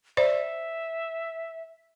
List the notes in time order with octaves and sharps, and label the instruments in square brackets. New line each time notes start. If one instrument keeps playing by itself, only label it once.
[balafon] C5 D5 [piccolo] E5